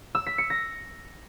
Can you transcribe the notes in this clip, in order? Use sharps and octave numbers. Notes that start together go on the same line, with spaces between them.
E6
B6
C#7
A#6